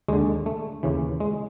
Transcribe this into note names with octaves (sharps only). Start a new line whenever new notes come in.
D#2 D3 G#3
A3
D#2 C#3 E3
G#3